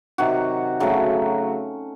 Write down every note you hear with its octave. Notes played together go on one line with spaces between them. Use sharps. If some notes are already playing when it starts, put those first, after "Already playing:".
C3 D#3 F#3 F#4
C#3 F#3 A3